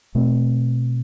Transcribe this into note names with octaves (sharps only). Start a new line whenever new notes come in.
B2 A3 C4